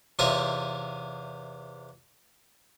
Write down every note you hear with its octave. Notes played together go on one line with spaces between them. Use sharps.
E2 C3 C#4 F4 D#5 E5